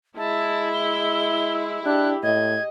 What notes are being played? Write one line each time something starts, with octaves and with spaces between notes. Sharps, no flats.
G#3 E4 A5
G7
D4 G4 F#6
A2 D#5 G#6